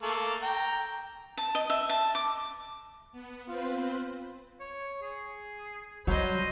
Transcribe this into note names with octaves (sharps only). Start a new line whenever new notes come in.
A3 A#3 A4
G5 A#5
A5
D#5
E5
A5
D6
B3
C4 F4 B4 C5
C#5
G#4
F#3 G3 C5 D#5 B5